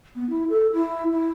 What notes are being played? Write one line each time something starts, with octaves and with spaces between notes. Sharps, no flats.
B3
E4
A4
E4
E4